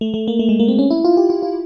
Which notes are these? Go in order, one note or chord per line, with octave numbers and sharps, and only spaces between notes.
A3
A3
A#3
A3
G#3
A#3
C4
C#4
E4
F4
G4
F4
F4